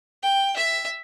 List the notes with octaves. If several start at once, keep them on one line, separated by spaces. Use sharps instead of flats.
G5
E5